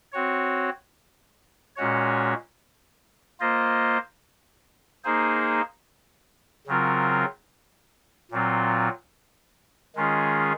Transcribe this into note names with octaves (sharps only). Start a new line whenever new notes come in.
C4 F#4 C#5
A#2 G#3 C#4 F#4 C#5
A#3 F4 C5 D#5
A#3 D#4 G#4 C5
C#3 F#3 C4 F4 A#4
A#2 F#3 C4 F4
D#3 G#3 C#4 F4 G#4